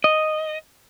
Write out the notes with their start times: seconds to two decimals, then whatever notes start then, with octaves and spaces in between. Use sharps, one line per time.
0.04 D#5